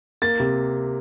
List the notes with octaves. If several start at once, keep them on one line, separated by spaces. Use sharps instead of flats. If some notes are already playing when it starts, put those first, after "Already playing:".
A#3 A6
C3